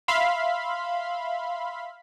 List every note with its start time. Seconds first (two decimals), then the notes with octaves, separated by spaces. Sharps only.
0.08 E5 F5 B5 C6